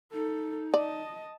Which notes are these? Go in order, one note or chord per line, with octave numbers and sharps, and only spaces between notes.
D#4 A4
D5 D#5 A5